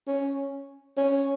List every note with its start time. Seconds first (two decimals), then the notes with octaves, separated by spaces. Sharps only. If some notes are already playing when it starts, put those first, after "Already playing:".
0.07 C#4
0.97 C#4